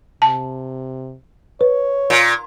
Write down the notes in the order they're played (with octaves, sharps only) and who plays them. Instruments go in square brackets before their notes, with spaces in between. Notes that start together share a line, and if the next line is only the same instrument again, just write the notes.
[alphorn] C3 [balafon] A5
[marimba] B4 [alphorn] C#5
[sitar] A#2